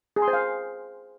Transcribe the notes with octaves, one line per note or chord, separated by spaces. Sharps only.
G#4
C6
C5
F5